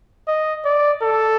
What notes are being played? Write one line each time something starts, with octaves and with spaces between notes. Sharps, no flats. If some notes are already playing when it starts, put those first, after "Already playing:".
D#5
D5
A4